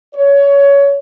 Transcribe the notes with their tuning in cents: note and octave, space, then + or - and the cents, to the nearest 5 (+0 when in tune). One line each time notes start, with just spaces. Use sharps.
C#5 +20